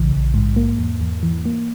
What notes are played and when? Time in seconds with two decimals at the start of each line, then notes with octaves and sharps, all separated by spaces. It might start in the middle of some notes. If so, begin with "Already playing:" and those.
Already playing: A#1 C#3 E3
0.12 A#1
0.34 G#2
0.56 A#3
0.79 E2
1.01 E2
1.23 E3
1.45 A#3